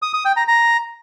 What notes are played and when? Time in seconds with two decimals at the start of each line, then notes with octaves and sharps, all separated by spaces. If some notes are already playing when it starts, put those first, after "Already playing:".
0.02 D#6
0.14 D#6
0.25 G5
0.36 A#5
0.48 A#5